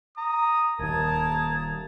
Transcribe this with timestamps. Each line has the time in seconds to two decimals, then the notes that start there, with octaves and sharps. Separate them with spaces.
0.17 A#5 D#6
0.79 D#1 D#2 A#4 A5 A#5 D#6 G#6